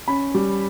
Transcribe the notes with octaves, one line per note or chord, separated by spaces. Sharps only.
C#4 B5
G3